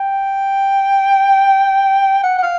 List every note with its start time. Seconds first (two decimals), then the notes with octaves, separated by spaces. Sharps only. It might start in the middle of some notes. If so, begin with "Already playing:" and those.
Already playing: G5
2.24 F#5
2.38 F#5
2.43 F5